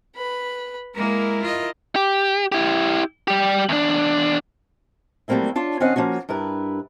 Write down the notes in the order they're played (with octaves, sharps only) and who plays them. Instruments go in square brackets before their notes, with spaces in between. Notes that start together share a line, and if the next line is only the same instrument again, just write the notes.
[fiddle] B4 B5
[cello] G#3 A#3 [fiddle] E4 A#4
[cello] F4 D#5
[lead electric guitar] G4
E4 G4
G3 G4
E2 D4
[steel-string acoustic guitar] F#3 G3 A3 A#3 C4 E4
D4 F4 C#5
D#3 C4 C#4 D#5 F5 F#5
F3 A#3 C#4 F#4
G2 E4 A#4 B4